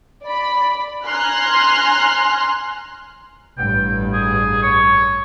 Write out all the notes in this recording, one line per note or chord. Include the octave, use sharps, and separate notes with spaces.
D5 B5
G#5 A#5 C6 F6 F#6
A1 G2 G5
G#4
C#5